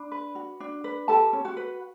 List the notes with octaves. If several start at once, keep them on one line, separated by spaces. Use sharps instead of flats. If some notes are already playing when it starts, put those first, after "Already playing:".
Already playing: D4 B5
B4
F#4
D4
B4
G4 A4 A5
C#4
F#4 F#5
B4